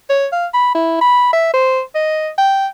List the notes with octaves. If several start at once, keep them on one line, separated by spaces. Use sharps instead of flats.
C#5
F5
B5
E4
B5
E5
C5
D#5
G5